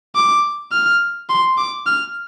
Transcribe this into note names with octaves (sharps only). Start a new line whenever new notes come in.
D6
F6
C6
D6
F6